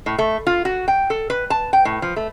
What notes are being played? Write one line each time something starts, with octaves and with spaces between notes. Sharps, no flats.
A2
A3
F4
F#4
G5
A4
B4
A5
G5
A2
F3
A3